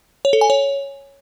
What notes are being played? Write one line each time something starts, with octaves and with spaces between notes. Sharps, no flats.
C#5
A4
G#5
C#5